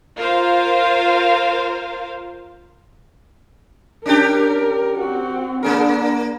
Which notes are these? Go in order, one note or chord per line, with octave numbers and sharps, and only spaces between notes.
F4 A#4 C5 F5
C#4 D4 G4 A#4
C4 F#4
A#3 D4 G#4 A#4